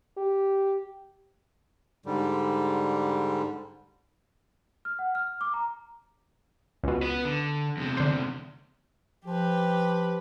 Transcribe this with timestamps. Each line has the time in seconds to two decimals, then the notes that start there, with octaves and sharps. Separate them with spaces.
0.17 G4
2.06 G#2 D3 G3
4.85 F6
4.99 F#5
5.15 F6
5.41 D6
5.54 A#5
6.83 C#2 B2
7.02 B3 B4
7.25 D3
7.77 E2 C3
7.97 D3 C5
9.25 F3 G4 B4